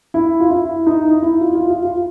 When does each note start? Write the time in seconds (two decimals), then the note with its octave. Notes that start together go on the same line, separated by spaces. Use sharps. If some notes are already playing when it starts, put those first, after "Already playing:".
0.14 E4
0.40 F4
0.50 E4
0.87 D#4
1.05 E4
1.22 E4
1.41 F4
1.55 F4
1.70 F4
1.85 F4